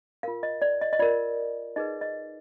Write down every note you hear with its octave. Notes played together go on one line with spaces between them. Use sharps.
F4 A#4 F5
D#5
D5
D#5
D#5
F4 A#4 D5
D#4 G#4 B4 D#5
D#5